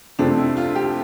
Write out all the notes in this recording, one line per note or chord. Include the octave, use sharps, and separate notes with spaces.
F2 C3 F3 A3 C4 D4
E4
F4
G4